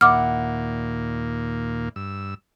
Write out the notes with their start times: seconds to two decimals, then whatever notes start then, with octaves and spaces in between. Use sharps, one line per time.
0.01 D#2 A#2 A#3 E4 D5 F#5 D6 F6
1.96 G2 E6